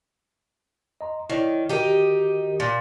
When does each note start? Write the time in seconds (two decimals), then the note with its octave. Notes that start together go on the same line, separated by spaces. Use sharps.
1.01 D#5 A#5 C6
1.30 D#3 E4 C#5 D5
1.69 D#3 D#4 F#4 G4 A#4
2.60 A#2